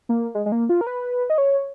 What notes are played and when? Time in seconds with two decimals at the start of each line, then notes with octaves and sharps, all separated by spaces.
0.09 A#3
0.35 G#3
0.46 G#3
0.52 A#3
0.69 F4
0.81 A#4
0.87 B4
1.30 D#5
1.38 C#5